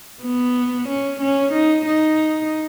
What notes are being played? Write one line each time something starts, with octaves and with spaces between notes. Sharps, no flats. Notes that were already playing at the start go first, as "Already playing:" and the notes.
B3
C#4
C#4
D#4
D#4